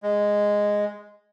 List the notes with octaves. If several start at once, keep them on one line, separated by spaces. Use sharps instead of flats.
G#3